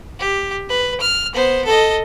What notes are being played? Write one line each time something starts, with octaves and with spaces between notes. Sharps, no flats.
G4
B4
F6
B3 C5
A4 D#5